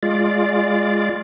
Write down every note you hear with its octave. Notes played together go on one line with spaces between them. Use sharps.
G#3 F4 D5